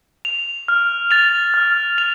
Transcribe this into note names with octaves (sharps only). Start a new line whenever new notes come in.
F7
F6
A6 F7
F6
A6 F7